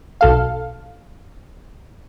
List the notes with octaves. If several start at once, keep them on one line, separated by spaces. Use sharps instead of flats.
B1 A4 F5